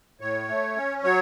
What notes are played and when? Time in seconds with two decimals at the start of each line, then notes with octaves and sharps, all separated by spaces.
0.20 A2 C#5
0.48 A3
0.76 C#4
1.03 F#3 C#5